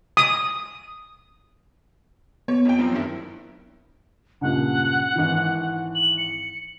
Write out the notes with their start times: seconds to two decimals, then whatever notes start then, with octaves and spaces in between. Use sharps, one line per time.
0.17 D#6
2.48 B3 C#5
2.65 F2 G5
2.78 F3 F#3 C4
2.92 G2 D#3 E4
4.41 C#2 G2 A#2 F#5
5.15 G#1 E3
5.95 F#7
6.18 C#7